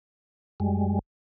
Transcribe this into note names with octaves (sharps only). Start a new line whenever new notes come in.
F#2 G3 G#3